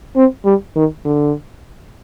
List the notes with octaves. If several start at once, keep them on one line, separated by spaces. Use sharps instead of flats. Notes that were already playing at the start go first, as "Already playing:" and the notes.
C4
G3
D#3
D3